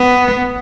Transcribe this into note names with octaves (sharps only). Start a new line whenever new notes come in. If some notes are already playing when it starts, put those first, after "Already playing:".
Already playing: B3